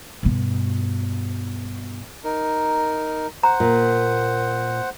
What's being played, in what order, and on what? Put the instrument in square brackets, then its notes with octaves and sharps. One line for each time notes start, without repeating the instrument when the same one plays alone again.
[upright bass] G2 B2
[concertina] D#4 A#4
[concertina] C5 F#5 [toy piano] A#5
[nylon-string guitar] A#2